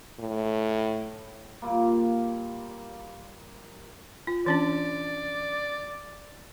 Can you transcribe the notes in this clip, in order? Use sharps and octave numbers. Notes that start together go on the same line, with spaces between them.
A2
A#2 G3 A#3
F4
E3 C#4 D4 D5